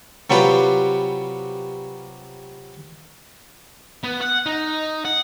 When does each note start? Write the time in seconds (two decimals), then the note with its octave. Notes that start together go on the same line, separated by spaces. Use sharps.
0.30 C3 F#3 G3 F4 G4 B4
4.04 B3
4.21 F#5
4.46 D#4
5.05 F#5